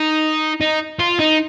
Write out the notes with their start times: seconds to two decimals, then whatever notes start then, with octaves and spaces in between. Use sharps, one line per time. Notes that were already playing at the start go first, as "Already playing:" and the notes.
Already playing: D#4
0.61 D#4
1.00 F4
1.19 D#4